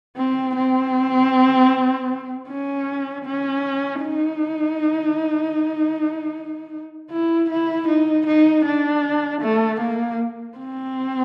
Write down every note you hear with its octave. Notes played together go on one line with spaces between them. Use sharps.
C4
C4
C#4
C#4
D#4
E4
E4
D#4
D#4
D4
A3
A#3
C4